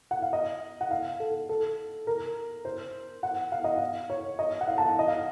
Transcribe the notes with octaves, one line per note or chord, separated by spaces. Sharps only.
F#5
F5
D#5
F#5
F5
A4
A4
A#4
C5
F#5
F5
D#5
F5
C#5
D#5
F#5
F5
A5
F#5
D#5
F5